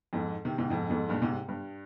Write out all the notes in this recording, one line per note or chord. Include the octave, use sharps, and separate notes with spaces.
F2 G#2
C3 D#3
G#2 C3
F2 G#2
F2 G#2
G2 A#2
G#2 C3
G2